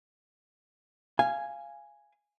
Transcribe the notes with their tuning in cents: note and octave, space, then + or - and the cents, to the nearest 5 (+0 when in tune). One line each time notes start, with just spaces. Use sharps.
F5 -15 G#5 +0